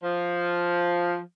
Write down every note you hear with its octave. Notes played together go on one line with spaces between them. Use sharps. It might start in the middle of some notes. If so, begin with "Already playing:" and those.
F3